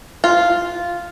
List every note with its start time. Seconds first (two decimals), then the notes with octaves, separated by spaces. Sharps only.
0.24 F4